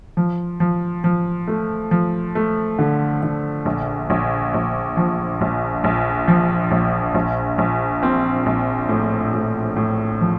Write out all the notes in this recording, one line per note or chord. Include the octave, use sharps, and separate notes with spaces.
F3
F3
F3
A3
F3
A3
D3
D3
A#1
A#1
A#1
F3
A#1
A#1
F3
A#1
A#1
A#1
C4
A#1
A2
A2
A2
F3